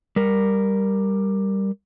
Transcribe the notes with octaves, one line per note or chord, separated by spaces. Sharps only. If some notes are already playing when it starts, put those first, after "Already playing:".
G3 A#4